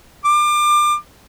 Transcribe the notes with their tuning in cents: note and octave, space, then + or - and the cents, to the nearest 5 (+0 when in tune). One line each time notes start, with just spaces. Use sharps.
D6 +30